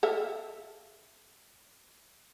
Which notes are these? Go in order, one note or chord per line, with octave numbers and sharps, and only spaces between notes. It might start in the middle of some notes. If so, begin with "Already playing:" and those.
A4 E5 F5